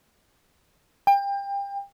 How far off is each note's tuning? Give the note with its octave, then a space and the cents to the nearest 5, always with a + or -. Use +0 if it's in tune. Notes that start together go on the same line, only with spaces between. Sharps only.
G5 +30